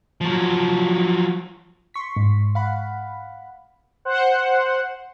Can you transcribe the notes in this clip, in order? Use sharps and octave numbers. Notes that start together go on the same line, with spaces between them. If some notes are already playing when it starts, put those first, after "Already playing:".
F3 F#3
C6 C#6 B6
G#2
F5 F#5 B5
C5 F#5